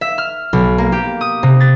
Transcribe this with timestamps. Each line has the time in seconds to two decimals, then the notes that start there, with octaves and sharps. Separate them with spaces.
0.01 E5
0.18 F6
0.53 B1
0.78 A#3
0.92 G4
1.21 D#6
1.43 C3
1.60 A6